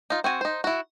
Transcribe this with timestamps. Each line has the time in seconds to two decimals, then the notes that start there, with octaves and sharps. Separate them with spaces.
0.10 D#4 F4
0.24 C4 F#4 G#5
0.41 D#4 C5
0.64 E4 F#4